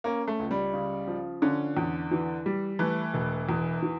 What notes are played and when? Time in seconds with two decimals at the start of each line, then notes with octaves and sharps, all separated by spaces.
0.04 A#3 C#4
0.28 A3
0.39 C#2
0.51 G3
0.73 C#3
1.07 F3
1.42 D3 C#4
1.77 E2
2.11 E3
2.46 G3
2.79 E3 A3
3.14 E1
3.49 E2
3.82 E3